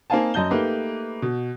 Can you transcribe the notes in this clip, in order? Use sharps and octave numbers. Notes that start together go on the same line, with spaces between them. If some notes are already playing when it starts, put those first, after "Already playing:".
A#3 C4 D#4 F5 G#5 A5
F#2 D#5 A5 G6 G7
A3 A#3 D#4 G4 B4
B2